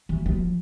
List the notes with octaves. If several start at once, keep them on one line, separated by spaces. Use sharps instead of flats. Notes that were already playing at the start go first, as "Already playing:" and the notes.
E3
F3